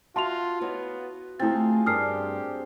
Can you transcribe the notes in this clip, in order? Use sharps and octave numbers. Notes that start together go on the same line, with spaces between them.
F4 F#4 E5 A5 C6 F7
B3 E4 C#5 D#5
D2 A3 C4 E4 F4 G#4 A6
G2 D4 G4 A#4 D#6 F6 C7